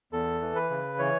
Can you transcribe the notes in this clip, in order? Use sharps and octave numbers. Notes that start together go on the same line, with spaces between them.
E2 A4
E3
B4
C#3
E3 C#5